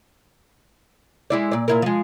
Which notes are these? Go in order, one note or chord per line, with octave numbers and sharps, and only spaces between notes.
G#3 E4 D5
A#2 D5
A#2 E4 A#4
F3 G#3